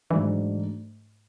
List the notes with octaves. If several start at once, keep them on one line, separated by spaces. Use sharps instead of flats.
G#2 E3 F#3 A3 D4